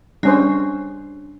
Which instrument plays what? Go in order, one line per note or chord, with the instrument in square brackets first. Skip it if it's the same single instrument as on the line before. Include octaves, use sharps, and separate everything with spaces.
[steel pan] G3 C#4 C5 [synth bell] D4